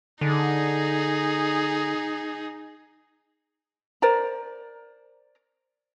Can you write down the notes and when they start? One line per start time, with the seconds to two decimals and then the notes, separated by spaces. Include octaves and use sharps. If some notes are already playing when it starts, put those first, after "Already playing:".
0.21 D3 D#4 G#4
4.02 A#4 C5 D5 A#5